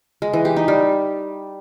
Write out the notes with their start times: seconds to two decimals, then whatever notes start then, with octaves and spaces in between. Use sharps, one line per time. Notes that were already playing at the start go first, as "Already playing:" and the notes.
0.22 G#3
0.33 E3
0.45 G4
0.56 D#4
0.68 G3